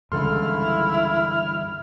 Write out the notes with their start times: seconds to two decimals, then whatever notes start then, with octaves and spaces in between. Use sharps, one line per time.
0.12 C#2 G2 D3 E3 E4 A4 C6 F6